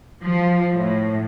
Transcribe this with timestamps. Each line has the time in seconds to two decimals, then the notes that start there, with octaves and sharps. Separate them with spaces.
0.23 F3
0.75 A2